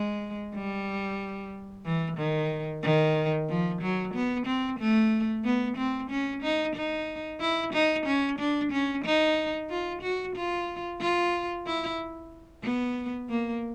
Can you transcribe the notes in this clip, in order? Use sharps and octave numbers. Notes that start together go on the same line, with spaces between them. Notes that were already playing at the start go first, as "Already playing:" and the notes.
Already playing: G#3
G3
E3
D#3
D#3
F3
F#3
B3
C4
A3
B3
C4
C#4
D#4
D#4
E4
D#4
C#4
D4
C#4
D#4
F4
F#4
F4
F4
E4
B3
A#3